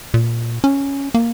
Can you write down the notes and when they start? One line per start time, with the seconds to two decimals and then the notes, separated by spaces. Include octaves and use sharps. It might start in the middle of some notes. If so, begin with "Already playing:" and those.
0.14 A#2
0.64 C#4
1.14 A#3